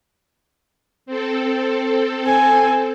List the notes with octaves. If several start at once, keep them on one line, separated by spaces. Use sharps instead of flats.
C4 A4
G#5